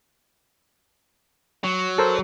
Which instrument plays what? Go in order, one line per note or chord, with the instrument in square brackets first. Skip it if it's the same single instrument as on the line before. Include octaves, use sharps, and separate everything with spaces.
[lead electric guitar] F#3
[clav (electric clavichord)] A4 A#4 C5